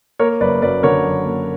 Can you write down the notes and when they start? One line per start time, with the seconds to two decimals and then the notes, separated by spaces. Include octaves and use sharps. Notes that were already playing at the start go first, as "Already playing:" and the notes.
0.19 A#3 A#4 C#5
0.41 F#1 B4 D5
0.62 F#2 B4 D5
0.83 D3 A#4 C#5
1.05 F#1
1.25 A#3